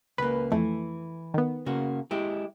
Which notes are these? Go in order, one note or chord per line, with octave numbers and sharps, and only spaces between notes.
C#2 A#3 B4
F2 E3 A3
D#3 B3
C#3 A#3 F#4
G#3 E4 G4